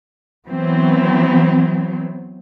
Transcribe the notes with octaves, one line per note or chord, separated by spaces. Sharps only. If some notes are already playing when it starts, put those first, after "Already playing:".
E3 F#3 B3 C4